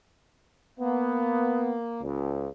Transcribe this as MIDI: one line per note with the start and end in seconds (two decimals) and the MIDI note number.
0.79 2.01 58
0.79 1.73 59
2.01 2.48 37